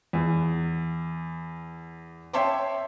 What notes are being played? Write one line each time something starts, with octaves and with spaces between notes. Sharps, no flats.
E2
C#5 E5 G5 A5 C6 D6